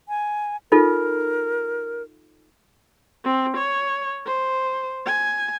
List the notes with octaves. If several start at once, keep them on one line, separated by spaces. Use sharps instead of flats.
G#5
D#4 F4 A4 A#4
C4
C#5
C5
G#5